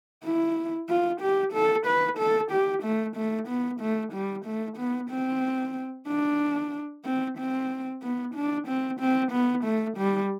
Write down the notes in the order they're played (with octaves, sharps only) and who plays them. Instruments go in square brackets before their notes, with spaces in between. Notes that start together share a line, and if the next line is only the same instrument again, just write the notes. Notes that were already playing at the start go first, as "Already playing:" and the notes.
[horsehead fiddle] E4
F4
G4
A4
B4
A4
G4
A3
A3
B3
A3
G3
A3
B3
C4
D4
C4
C4
B3
D4
C4
C4
B3
A3
G3